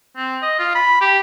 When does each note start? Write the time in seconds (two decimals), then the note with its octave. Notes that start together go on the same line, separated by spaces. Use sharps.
0.17 C4
0.42 D#5
0.59 F4
0.75 B5
1.01 G4